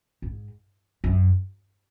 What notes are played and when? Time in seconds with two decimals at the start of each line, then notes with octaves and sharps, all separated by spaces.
0.22 G#2
1.04 F#2